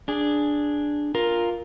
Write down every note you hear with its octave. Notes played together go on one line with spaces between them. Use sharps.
D4 G#4
F4 A#4